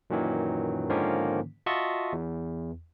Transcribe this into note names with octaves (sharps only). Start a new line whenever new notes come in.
F#2 A#2 D#3 E3 F#3
G#2 D3 D#3 F3 A#3 C#4
F4 F#4 D#5 E5 A5 C#6
E2